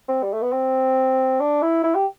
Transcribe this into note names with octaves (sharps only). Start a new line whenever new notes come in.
C4
G3
A3
B3
C4
D4
E4
E4
G4